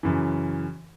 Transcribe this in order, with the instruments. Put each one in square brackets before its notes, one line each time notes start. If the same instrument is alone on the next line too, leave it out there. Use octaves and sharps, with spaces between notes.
[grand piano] F#2 C#3 E3